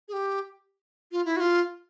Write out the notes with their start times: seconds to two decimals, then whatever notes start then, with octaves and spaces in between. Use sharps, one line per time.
0.08 G#4
0.13 G4
1.12 F4
1.25 E4
1.37 F#4
1.40 F4